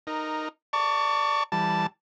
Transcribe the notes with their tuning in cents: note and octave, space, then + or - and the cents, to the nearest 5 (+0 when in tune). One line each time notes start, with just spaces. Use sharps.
D#4 -10 A#4 +5
D5 +0 A5 +30 C#6 +20
E3 +0 G3 -5 A5 +0